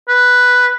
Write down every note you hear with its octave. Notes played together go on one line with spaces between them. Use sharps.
B4